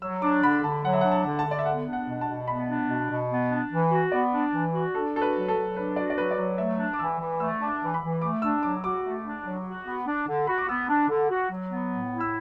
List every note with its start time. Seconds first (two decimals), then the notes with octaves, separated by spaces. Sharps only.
0.02 F#3 E6
0.22 D4 D6
0.43 D3 B5
0.63 D3 A5
0.84 F#3 F#5
0.93 E5
1.01 D4 F#5
1.11 A5
1.25 D3
1.39 A5
1.46 D3
1.51 D5
1.59 E5
1.66 B3 F#5
1.87 D4
1.93 F#5
2.08 B2
2.21 A5
2.28 B2
2.48 B3 B5
2.69 D4
2.89 B2
3.09 B2
3.30 B3
3.51 D4
3.71 E3
3.91 F#4
4.12 B3 D5
4.33 D4
4.53 E3
4.74 F#4
4.94 D4 A4
5.15 F#4 A4
5.22 B4
5.35 F#3
5.48 A4
5.56 F#3
5.76 D4 B4
5.96 F#4 D5
6.10 D5
6.17 F#3 B4
6.31 D5
6.37 F#3 B4
6.58 A3 E5
6.79 D4
6.93 D6
6.99 E3 E6
7.20 E3
7.40 A3 E6
7.60 D4
7.68 D6
7.81 E3
7.94 B5
8.02 E3
8.21 A3 D6
8.42 D4 E6
8.63 F#3 D6
8.84 F#4 D6
9.04 A3
9.25 D4
9.45 F#3
9.66 F#4
9.86 B3
10.07 D4
10.27 D3
10.47 F#4 B5
10.58 D6
10.68 B3 E6
10.88 D4
11.09 D3
11.29 F#4
11.50 F#3
11.70 B3
11.91 A2
12.11 E4
12.20 E6